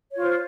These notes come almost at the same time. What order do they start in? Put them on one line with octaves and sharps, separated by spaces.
C#5 F4 C5